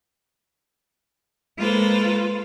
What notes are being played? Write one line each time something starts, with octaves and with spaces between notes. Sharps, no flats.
G#3 A#3 F4 A4 B4 C5